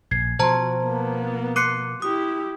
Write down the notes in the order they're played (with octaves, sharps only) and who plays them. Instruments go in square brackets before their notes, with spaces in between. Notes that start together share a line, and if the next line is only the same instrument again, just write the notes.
[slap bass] A#1 [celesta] G#6 C7
[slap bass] B2 F3 [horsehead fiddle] F#4 [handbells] C5 A5 A#5 [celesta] C6 G#6
[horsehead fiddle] A#3 B3
[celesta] C6 F#6 D#7 [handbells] D6 C7 C#7
[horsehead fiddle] E4 G4 [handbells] D#6